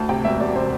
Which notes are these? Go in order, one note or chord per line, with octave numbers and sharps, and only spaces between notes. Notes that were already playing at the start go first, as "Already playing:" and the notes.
Already playing: D2 A5
C3 G5
E1 E5
E1 D5
C3 C5